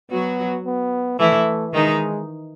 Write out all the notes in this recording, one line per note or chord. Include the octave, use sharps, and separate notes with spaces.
F#3 B3 F#4
B3
E3 A3 E4
D#3 G#3 D#4